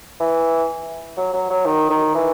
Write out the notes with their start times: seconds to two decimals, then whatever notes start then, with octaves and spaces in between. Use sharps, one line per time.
0.20 E3
1.17 F#3
1.33 F#3
1.50 F#3
1.66 D#3
1.90 D#3
2.15 E3